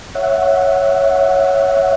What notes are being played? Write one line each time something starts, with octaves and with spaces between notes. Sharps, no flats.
C#5 E5 F#5